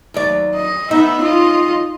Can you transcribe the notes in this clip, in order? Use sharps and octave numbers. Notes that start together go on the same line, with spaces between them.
D#2 F#3 D5
D#5
B3 D#4 E5
F4 D#5